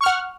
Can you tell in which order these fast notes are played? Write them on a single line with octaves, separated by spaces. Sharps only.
C#6 F6 F#5